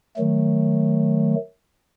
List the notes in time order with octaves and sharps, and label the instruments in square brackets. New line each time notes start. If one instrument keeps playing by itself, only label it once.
[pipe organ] D#3 F#3 A3